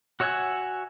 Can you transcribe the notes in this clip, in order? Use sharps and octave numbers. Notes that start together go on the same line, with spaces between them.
F#4 C#5 E5 F#5 G#5